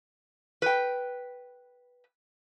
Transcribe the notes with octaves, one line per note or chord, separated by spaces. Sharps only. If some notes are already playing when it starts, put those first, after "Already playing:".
B4 G5